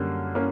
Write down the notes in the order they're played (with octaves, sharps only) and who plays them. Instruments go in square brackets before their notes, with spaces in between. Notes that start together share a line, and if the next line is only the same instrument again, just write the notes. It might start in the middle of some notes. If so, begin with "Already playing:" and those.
Already playing: [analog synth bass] F#2 [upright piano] D3 G3 A#3 C#4
[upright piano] A#3 C#4